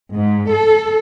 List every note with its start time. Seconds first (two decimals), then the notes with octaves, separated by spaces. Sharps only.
0.14 G#2
0.50 A4